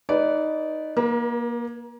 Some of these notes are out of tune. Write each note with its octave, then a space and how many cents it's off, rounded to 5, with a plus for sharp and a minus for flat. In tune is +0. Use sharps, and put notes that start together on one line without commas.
D#4 +0 B4 +0 D5 -20
A#3 +25 B4 -40